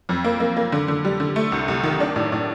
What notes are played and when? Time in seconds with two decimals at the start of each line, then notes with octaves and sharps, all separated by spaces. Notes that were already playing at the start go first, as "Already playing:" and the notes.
0.09 F2
0.24 A#3
0.40 A#3
0.57 A#3
0.72 D3
0.88 D3
1.05 G3
1.20 D3
1.36 A3
1.52 C2
1.68 C2
1.83 D#3
2.00 D4
2.16 A2
2.32 A2